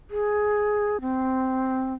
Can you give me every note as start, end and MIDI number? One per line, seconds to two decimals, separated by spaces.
0.10 1.01 68
1.01 1.94 60